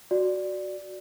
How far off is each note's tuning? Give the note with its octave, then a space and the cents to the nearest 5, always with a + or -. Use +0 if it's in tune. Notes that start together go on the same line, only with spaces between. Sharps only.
F#4 +0 D5 +0